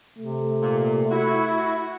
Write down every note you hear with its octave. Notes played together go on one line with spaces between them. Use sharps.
C3 A3
A#2
E4 F#4